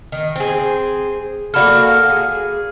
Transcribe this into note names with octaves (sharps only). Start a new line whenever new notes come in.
D#3
C4 G#4
A#3 F#4 A4 D5 B5 F6
F5 F6
G#4